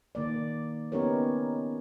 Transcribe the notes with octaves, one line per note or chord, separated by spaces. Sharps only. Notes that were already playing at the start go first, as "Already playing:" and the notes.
D#3 A#3 D5
B3 C#4 D#4 G4 A#4 C#5